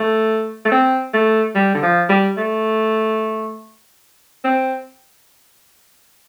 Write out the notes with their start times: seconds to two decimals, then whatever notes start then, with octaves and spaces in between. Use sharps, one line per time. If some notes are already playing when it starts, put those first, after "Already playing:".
Already playing: A3
0.65 A3
0.72 C4
1.13 A3
1.55 G3
1.75 D3
1.82 F3
2.09 G3
2.38 A3
4.44 C4